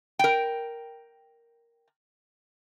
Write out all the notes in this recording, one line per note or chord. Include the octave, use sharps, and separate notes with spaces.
A#4 G5